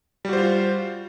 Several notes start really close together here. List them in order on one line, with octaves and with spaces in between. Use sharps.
G3 F#4 C5 F4